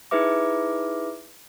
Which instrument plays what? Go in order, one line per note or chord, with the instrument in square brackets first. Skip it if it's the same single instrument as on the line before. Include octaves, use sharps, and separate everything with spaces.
[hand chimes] D#4 E4 G#4 B4 E5 D6